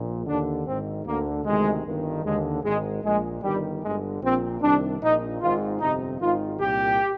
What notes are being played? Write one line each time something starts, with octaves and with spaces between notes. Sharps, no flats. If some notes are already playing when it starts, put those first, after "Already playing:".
Already playing: A#1 A#2
D#2 D3 D4
G#1 G#2 D#3 C4
D2 D3 A#3
D2 C3 D#3 G#3
G1 G2 D#3
D#2 D3 G#3
G#1 G#2 D#3 G#3
A#1 A#2 G#3
G1 G2 D#3 G3
G1 G2 D3 G#3
A#1 A#2 C4
C2 C3 D#3 D4
A#1 A#2 D#4
G#1 G#2 D#3 F4
G1 F2 C3 D#4
G#1 G#2 D#3 F4
C2 A#2 G4